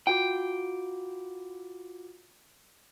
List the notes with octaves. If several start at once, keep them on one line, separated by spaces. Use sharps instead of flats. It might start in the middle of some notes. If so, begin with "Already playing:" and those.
F4 F#4 G5 D6